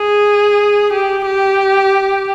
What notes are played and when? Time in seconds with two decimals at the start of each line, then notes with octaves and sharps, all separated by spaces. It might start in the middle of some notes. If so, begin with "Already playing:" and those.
Already playing: G#4
0.92 G4
1.26 G4